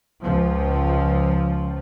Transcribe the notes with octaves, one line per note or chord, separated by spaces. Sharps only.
C#2 F3